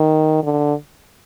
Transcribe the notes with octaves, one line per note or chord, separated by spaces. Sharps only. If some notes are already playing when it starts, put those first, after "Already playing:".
Already playing: D#3
D3